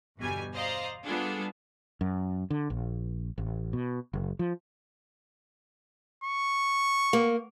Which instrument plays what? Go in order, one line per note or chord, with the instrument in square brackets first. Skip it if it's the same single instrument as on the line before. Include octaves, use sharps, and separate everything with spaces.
[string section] G1 E2 B2 G3 G#5
C5 D5 D#5 F5 A#5 C6
G3 B3 D4 F4 G#4 A4
[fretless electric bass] F#2
D3
A#1
A1
B2
F#1
F3
[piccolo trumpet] C#6
[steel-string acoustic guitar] A#3